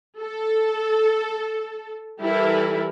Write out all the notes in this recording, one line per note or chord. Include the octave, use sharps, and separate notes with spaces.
A4
E3 G3 E4 G4 A4 A#4